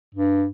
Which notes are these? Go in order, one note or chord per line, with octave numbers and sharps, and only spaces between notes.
G2